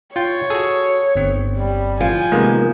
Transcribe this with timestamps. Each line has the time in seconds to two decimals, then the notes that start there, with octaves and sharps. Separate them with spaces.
0.16 F4 C#5 G5
0.50 F#4 G#4 A4
1.15 G1 C4
1.57 G3
2.00 F3 G#5
2.32 C3 D#3 G#3 A#3 B3